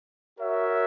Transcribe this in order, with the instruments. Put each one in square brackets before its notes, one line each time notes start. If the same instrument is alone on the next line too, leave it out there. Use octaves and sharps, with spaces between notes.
[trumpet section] F#4 A#4 C#5 E5